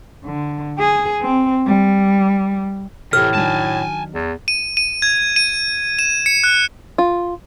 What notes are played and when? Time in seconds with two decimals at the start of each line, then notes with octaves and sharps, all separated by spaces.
0.24 D3
0.79 G#4
1.22 C4
1.66 G3
3.13 A2 C3 E3 G4 A4 F6
3.35 D#3 F#3 D4 G#5 A5
4.14 E2
4.48 D#7
4.77 D#7
5.02 G#6
5.36 D#7
5.99 E7
6.26 C#7
6.44 F#6
6.98 F4